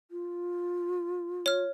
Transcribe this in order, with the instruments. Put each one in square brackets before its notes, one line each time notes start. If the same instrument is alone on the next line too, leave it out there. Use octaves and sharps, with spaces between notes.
[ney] F4
[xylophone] C#5 F6